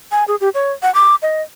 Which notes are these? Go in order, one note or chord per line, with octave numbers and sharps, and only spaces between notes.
G#5
G#4
G4
C#5
F#5
D6
D#5